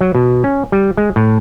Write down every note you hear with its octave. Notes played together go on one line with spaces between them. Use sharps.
F#3
B2
C#4
G3
G#3
A2